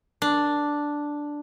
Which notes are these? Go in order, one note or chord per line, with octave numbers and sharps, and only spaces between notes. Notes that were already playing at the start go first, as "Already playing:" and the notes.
D4